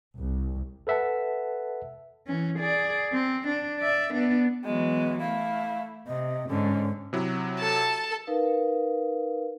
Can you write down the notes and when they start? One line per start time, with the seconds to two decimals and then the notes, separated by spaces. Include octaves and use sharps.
0.18 C2
0.87 A4 B4 E5 F#5 A5
2.27 E3 C#4
2.60 G#4 D5
3.12 C4
3.47 D4
3.79 D5 E5
4.14 B3 D4
4.64 E3 F#3 G#3 B3
5.20 A3 E4 F5
6.07 C3 D#5
6.49 G#2 D3 C#4
7.13 C3 F#3 E4
7.60 A4 A5
8.27 D#4 A#4 B4 F5